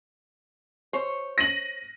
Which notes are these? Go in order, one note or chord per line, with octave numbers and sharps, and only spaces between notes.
C5 C#5
A#6 D#7 F#7